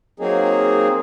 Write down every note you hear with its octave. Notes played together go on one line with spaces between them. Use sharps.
F#3 A#3 C4 D#4 G#4